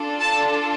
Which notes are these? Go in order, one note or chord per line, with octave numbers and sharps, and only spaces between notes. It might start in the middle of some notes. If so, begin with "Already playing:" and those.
Already playing: D4 F4 A4
A5